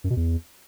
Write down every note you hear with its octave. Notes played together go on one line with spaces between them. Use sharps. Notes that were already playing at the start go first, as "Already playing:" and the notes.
F#2
B2
E2